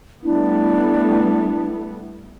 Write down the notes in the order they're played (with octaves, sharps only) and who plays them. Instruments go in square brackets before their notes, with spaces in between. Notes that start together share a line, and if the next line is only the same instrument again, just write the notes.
[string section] G3 A3 B3 [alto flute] D4 [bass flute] E4